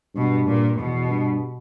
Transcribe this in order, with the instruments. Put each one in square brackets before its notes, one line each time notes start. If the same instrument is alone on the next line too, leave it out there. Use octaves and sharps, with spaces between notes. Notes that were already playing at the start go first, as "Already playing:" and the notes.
[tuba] G2 [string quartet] B2
[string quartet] A#2
[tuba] E2 [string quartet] B2
[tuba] G2